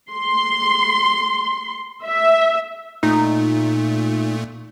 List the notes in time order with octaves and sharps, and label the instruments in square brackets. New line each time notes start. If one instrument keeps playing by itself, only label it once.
[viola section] C6
E5
[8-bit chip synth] A#2 A3 [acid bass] D#4